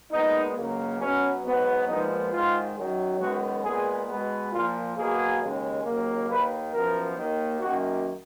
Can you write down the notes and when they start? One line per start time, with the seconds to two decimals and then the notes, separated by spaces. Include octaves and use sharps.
0.12 A#2 G#3 B3 D#4
0.56 C#2 C#3 F#3 A#3
1.00 B2 F#3 B3 C#4
1.45 G#2 F#3 B3
1.87 A#2 F3 G#3 B3 D#4
2.31 G#2 D#3 G#3 F4
2.76 F#2 D#3 F#3
3.20 F#2 D#3 G#3 B3 F#4
3.64 A#2 G#3 B3 G#4
4.08 B2 G#3 B3
4.52 A#2 F3 A#3 F4
4.96 B2 F#3 A#3 G#4
5.40 D#2 C#3 G#3
5.85 D#2 C#3 F#3 A#3
6.29 D#2 D#3 A#3 B4
6.72 F#2 F3 B3 A#4
7.16 D#2 D#3 A#3
7.60 F#2 D#3 A#3 F#4